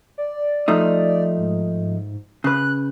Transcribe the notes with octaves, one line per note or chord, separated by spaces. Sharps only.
D5
F3 A3 D#4
G#2
C#3 B4 F#6